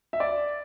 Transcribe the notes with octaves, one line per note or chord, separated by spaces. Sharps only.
E5
D5